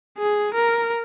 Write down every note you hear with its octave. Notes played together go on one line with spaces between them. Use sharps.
G#4
A#4